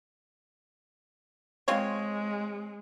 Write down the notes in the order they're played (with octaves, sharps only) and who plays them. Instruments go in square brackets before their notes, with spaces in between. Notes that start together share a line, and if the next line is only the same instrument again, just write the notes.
[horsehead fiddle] G#3 [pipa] C4 F4 C#5